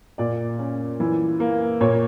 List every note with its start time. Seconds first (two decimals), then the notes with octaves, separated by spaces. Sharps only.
0.18 A#2 D5
0.59 C#4
1.00 E3
1.40 A#3
1.81 A#2 C#5